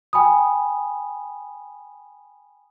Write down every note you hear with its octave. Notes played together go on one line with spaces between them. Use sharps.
G5 G#5 B5 D#6